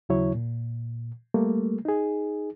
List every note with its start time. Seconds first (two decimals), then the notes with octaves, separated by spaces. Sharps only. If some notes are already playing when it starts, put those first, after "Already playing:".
0.09 D#2 C#3 F#3 E4 C#5
0.34 A#2
1.34 G3 A3 A#3
1.85 D#4 G#4